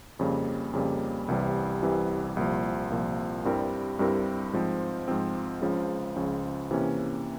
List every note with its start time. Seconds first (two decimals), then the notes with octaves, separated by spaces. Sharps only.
0.19 F2 C#3 G3 A#3
0.73 F2 C#3 G3 A#3
1.28 C2 C3 E3 G3
1.82 C2 C3 E3 G3
2.37 C2 A#2 F3
2.90 C2 A#2 F3
3.45 G2 G3 C4 E4 A#4
3.99 G2 G3 C4 E4 A#4
4.53 G#2 F3 C4
5.08 G#2 F3 C4
5.62 C#2 C#3 F3
6.16 C#2 C#3 F3
6.71 C3 E3 A#3 C#4